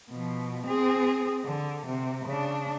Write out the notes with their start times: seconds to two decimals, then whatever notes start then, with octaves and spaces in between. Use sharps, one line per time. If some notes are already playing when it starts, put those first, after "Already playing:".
0.11 B2 F3
0.67 C4 G#4
1.45 D3
1.86 C3
2.26 C#3 D4